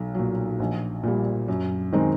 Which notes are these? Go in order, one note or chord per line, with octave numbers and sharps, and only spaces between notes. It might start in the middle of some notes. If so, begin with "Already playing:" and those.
Already playing: B1
A#2 F#3
A#1
A#2 G3
F#2
D#3 G#3 C4 D#4